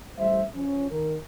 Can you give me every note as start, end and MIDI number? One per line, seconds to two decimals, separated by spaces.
0.18 0.41 33
0.18 0.41 55
0.18 0.41 72
0.18 0.41 76
0.54 0.87 53
0.54 0.87 61
0.90 1.16 51
0.90 1.16 70